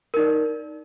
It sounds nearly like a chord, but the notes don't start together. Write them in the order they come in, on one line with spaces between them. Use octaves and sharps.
A#4 D#4 D5